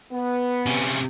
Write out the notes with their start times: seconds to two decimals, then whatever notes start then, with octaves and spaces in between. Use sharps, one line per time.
0.12 B3
0.66 C3 C#4